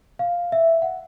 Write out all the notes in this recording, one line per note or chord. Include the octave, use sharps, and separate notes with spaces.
F5
E5
F#5